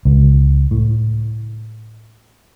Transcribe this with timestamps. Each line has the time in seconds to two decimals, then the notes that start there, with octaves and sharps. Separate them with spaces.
0.05 C#2
0.71 A2